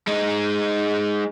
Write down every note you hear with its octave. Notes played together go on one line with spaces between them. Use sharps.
G#3 D#4